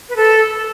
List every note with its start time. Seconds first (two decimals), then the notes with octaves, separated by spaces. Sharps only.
0.09 B4
0.16 A4